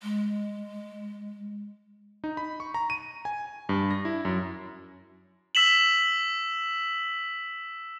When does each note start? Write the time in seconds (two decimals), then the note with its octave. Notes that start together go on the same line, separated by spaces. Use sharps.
0.03 G#3
2.24 D#4
2.37 B5
2.60 C#6
2.74 A#5
2.90 D#7
3.25 G#5
3.69 G2
3.91 A#6
4.05 E4
4.25 F#2
5.55 E6 B6 E7 F#7